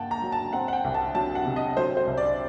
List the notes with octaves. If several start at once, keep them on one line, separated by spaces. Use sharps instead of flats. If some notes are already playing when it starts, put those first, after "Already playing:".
Already playing: G2 A#3 F#5 G5 A5
A#5
F#3
A5
C4 F#5
F#5
G5
C2
A5
F#3 A5
F#5
C3
D#5
F#3 C5
C5
C2
D5